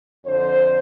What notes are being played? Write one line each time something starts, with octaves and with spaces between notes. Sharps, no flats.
F2 D3 F3 C5